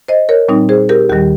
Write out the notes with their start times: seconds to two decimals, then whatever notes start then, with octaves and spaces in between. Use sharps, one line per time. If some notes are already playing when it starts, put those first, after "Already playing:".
0.08 C5 D#5
0.29 A#4 C#5
0.48 A#2 G3 C4 D#4
0.69 G#4 C5
0.89 G4 A#4
1.09 D#2 D#3 G3 G4